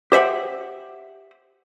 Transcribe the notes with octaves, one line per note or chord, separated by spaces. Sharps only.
G4 C5 E5 F#5 G5